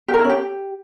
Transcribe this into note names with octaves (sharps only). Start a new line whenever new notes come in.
G4
A#4
E4
C#4
G4